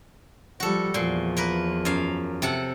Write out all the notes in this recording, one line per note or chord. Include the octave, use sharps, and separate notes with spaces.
F3 G3 F#4 A4
E2 A#2 F3 C6
A#3 A#4 B4
F#2 F5
C3 A4 F#5